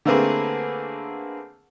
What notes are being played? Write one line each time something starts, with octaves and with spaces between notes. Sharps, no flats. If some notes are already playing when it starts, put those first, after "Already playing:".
D3 A3 A#3 C4 G#4 B4